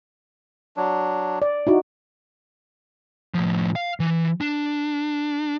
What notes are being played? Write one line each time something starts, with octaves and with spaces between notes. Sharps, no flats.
F#3 D4
D5
D#4 E4 F#4
A2 F3
F5
E3
D4